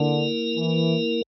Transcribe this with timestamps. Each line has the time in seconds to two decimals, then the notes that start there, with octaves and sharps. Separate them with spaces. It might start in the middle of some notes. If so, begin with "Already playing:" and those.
Already playing: D3 A#3 E4 A#4
0.57 E3